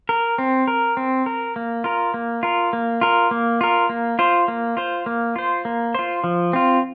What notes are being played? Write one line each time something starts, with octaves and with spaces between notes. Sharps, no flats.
A#4
C4
A#4
C4
A#4
A#3
F4 A#4
A#3
F4 A#4
A#3
F4 A#4
A#3
F4 A#4
A#3
F4 C5
A#3
F4 C5
A#3
F4 C5
A#3
F4 C5
F3
C4 F4